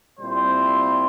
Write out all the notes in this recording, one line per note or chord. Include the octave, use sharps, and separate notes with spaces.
A#2 G3 C4 E4 C5